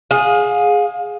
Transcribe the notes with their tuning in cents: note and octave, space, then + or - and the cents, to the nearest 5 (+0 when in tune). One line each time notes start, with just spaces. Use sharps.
G#4 +0 F5 +35